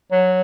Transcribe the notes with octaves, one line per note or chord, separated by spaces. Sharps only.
F#3